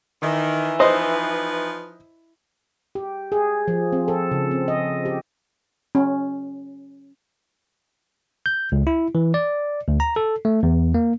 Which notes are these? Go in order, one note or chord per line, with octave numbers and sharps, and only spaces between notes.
D#3 E3
F3 D#4 B4 C5 D#5
G4
G#4
F3
C4
A4
C#3
C4
D#5
G4
C#4
G6
C#2
E4
E3
D5
D2
A#5
A4
A3
E2
A#3